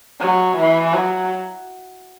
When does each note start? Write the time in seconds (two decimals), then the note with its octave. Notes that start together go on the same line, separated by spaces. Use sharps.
0.20 F#3
0.57 E3
0.94 F#3